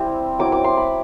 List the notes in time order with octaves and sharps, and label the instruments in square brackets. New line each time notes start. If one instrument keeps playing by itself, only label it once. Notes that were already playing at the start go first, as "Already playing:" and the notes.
Already playing: [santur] G3 C4 E4
F#3 C4 E4 D6
D6
C6
B5